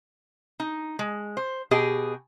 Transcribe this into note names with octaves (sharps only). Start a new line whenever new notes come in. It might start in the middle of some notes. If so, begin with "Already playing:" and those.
D#4
G#3
C5
B2 G4 G#4 D#5